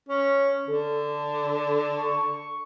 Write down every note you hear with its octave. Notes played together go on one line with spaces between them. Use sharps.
C#4
D3 A4
C#6